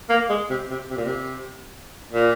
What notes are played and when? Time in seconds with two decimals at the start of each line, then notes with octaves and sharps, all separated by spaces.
0.09 A#3
0.29 G#3
0.50 C3
0.71 C3
0.90 C3
0.97 A#2
1.05 C3
2.12 A#2